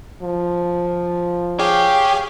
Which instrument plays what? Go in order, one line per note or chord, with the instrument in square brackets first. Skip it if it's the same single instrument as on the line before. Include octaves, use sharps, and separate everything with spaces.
[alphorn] F3
[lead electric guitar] G4 [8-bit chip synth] G#4 C#5 F5